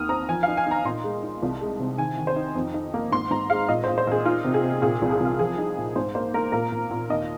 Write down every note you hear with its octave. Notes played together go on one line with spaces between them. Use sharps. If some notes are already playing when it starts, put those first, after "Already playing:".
Already playing: D#2 D#3 D#6 F6
C4 A#5
F3 G#5
D#4 F5
G#5
D#4 A#5
A#2 C6
G#3
D#4
C2
G#3
C3
D#3 G#5
D#3
C5
D#4
F2
D#4
A#3
G#2 C6
G#2 A#5
G#3 F5
A#2 D#5
A#2 C5
C5
A#2 G#4
D#4 F4
C3
G#4
C3
A#2 G#4
C2
G#4
C2 F4
F3 G#4
D#4
A#2
G#2 C5
A#3 C5
A#3 A#4
A#2 A#4
A#2
A#2
D#2 D#5